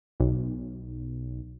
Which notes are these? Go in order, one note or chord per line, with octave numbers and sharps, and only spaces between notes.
B1